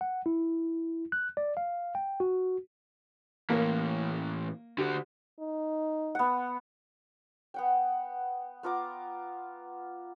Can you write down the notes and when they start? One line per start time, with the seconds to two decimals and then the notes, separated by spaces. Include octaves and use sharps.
0.01 F#5
0.26 E4
1.12 F#6
1.37 D5
1.57 F5
1.95 G5
2.20 F#4
3.50 A2 E3 A#3
4.78 D3 F#4 G4
5.40 D#4
6.15 B3 F#5
7.54 B3 F#5 G5
8.63 B3 F4 A#5 D6